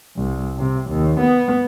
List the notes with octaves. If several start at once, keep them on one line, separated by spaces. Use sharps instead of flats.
C2
C3
D#2
B3